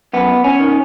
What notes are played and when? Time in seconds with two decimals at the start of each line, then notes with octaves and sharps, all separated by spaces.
0.13 F#2 B3
0.44 C#4
0.60 D#3